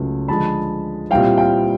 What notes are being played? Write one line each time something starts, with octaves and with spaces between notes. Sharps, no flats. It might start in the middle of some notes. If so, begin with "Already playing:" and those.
Already playing: C#2 C#3 F#3 A3
D3 F3 G#3 A5 B5
A#2 G3 C4 E4 F5 G5
F5 G5